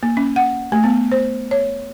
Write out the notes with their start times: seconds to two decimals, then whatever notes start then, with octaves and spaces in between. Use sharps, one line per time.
0.03 A#3
0.17 C#4
0.36 F#5
0.72 A3
0.84 B3
1.12 C5
1.51 C#5